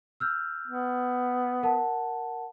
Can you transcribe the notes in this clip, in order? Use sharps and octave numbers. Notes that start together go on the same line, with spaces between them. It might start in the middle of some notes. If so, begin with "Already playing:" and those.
E6 F6 G6
B3
A#4 F#5 A5